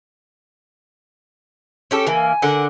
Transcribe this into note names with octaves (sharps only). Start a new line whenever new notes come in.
C#4 G4 A4
E3 A#3 G#5
D3 A#4 F#5